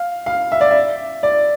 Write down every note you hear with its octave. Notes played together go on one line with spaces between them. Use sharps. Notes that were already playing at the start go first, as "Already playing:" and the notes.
Already playing: F5
F5
E5
D5
E5
D5